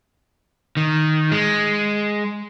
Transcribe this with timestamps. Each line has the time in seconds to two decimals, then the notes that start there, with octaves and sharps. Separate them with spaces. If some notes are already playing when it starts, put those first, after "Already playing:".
0.77 D#3
1.32 G#3